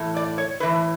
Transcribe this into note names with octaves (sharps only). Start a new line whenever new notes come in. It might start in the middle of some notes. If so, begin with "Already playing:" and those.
Already playing: A2 E3
D5
C#5
A2 E3 B4